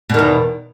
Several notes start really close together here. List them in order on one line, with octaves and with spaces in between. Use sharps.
B2 D#3 E2